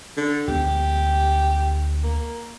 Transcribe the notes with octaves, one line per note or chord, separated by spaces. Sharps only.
D3
D2 G#3 B3 G4
A#3